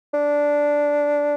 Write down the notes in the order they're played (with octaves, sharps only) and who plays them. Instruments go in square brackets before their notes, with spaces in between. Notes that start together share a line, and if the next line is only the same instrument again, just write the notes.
[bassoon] D4